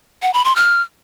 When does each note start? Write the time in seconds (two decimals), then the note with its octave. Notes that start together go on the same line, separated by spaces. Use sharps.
0.22 F#5
0.34 B5
0.45 C6
0.56 F6